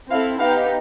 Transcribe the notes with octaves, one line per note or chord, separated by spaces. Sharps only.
C4 E4 A4 F5
B3 D#4 G4 F5